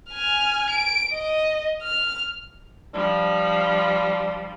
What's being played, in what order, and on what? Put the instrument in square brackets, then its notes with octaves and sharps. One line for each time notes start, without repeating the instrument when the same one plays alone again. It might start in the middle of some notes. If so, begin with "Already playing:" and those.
[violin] G#5 F6
D7
D#5
F6
[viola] F3 G3 [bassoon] D4